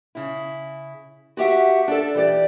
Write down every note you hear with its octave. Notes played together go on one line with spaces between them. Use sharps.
C#3 E4
F#4 G4 E5 F#5
D4 A4
E3 G4 D5